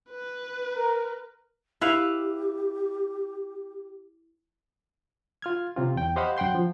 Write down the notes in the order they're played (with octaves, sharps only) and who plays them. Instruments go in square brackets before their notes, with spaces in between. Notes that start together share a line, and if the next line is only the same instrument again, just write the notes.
[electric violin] B4
[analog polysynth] A#4
[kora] E4 B4 F5 [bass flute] G4
[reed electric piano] F4 F6 G#6
C3 C4 F4
E2 G5
G4 C5 D#5 F5 F#5 B5
F#2 F#5 G5 C6 G6
F3